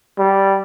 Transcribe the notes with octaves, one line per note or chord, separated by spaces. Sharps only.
G3